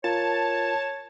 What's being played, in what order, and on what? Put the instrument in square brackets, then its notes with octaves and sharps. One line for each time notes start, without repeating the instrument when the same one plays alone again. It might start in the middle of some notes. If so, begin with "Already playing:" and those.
[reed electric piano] F4 A#4 [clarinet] C#5 [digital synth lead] A5